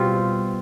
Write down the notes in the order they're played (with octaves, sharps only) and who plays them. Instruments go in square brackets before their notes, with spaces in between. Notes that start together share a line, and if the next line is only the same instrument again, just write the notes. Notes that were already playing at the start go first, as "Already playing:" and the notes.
Already playing: [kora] B2 G3 C4 F4